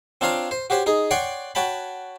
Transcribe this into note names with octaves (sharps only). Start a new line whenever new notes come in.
C4 D4 F4 C#5 F5 A#5
C5
F#4 G4 C5 C#5
D#4 G#4
C#5 D5 F#5 G5 C6 C#6
F#4 C#5 G5 A5 B5